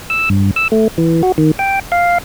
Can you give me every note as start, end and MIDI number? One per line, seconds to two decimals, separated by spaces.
0.10 0.29 88
0.30 0.51 43
0.56 0.68 88
0.72 0.88 57
0.98 1.22 52
1.23 1.32 66
1.38 1.51 51
1.59 1.79 79
1.92 2.18 77